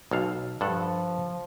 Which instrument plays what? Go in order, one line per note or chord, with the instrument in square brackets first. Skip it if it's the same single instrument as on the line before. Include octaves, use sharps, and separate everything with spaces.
[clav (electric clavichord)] B1 A4 F5
[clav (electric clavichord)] G2 A4 F#5 [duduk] F3